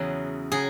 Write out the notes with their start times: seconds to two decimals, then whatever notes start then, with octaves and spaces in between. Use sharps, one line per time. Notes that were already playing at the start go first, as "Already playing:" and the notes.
Already playing: E2 C#3 F#3
0.52 C#3 F#3 G#4